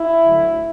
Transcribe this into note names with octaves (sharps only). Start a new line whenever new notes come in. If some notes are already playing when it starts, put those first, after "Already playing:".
Already playing: E4
D2 D3 F#3